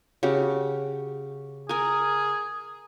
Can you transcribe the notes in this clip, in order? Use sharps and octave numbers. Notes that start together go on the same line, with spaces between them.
C#3 F#4 G4
G#4 A#4 G#5